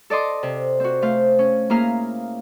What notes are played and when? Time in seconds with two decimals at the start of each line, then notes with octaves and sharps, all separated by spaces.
0.10 A4 D5 D#5 C6 D6
0.43 C3
0.80 C4 F#4
1.02 A3 C5 F5
1.39 C#4
1.70 A#3 E4 G#4 F5 A#5 F6